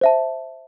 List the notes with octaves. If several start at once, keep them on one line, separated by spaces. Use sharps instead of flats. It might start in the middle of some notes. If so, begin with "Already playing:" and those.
C5 E5 A5